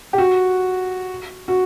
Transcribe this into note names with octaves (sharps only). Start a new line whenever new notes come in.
G4
F#4
F#4